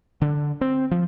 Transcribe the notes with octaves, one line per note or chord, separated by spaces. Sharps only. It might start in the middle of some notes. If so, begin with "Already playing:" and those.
D3
C4
F3